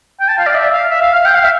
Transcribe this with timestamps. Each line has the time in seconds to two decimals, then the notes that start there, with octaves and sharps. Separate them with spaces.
0.20 G5
0.28 A5
0.38 F5
0.47 D5
0.55 E5
0.73 F5
0.90 E5
1.02 F5
1.15 F5
1.25 G5
1.35 F5
1.44 E5